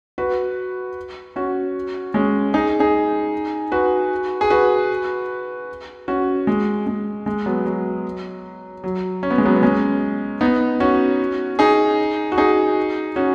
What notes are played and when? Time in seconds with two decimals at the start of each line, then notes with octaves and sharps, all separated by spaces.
0.18 F#4 B4
1.36 C#4 F#4
2.14 G#3 C#4
2.54 D#4 G#4
2.80 D#4 G#4
3.72 F#4 B4
4.41 G#4
4.50 F#4 B4
6.08 C#4 F#4
6.47 G#3
6.87 G#3
7.26 G#3
7.46 F#3 B3
7.66 F#3
8.84 F#3
9.23 C#4
9.31 B3
9.38 G#3
9.46 F#3 B3
9.56 B3
9.63 G#3 C#4
10.41 B3 D#4
10.80 C#4 F#4
11.59 D#4 G#4
12.32 F#4
12.38 D#4 G#4
13.16 C#4 F#4